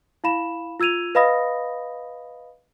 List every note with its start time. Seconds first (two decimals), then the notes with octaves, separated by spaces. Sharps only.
0.24 E4 F5 B5 E7
0.80 F4 E6 G#6 D#7 F7
1.15 B4 D#5 F5 B5 D#6 A#6